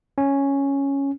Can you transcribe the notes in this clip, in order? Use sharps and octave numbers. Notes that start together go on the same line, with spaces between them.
C#4